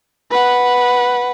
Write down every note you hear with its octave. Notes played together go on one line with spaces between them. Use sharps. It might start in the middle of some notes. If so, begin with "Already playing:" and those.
B4 F#5